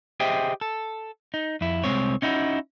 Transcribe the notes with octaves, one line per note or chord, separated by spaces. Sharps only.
G4 G#4 C5 D#5 E5 G5
A4
D#4
F2 E4
C2 C#3 G#3 C4 C#5
C#4 D#4 E4 F#4